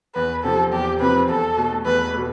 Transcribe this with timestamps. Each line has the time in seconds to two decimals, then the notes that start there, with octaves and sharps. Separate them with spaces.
0.15 E2 B4
0.44 C3 F3 C4 A4
0.72 E2 G4
1.00 C3 F3 C4 B4
1.28 E2 A4
1.57 B2 A3
1.85 E2 B4
2.13 B2 A3